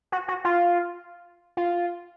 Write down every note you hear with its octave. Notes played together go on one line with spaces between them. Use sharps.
F#4
F#4
F4
F4